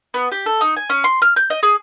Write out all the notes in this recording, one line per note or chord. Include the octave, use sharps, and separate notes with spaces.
B3
G4
A4
D#4
G#5
C#4
C6
F6
G6
D#5
G#4